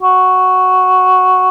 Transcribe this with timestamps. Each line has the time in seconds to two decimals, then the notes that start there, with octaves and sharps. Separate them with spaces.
0.02 F#4